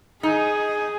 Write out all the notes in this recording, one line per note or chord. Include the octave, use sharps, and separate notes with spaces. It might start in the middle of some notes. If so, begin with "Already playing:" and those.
D#4 G#4